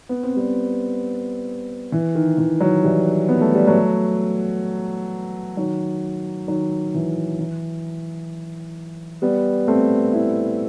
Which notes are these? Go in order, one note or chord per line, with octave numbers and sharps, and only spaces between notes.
B3
C4
G3 B3
E3
D#3
E3
D#3 F#3
E3 G3
B3
A3
G3
F#3 A3
D#3 F#3
D#3 F#3
E3
E3
G3 B3
A3 C4
C4 E4